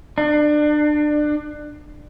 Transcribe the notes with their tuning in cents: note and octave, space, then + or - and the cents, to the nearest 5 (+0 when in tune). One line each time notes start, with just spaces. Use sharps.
D4 +25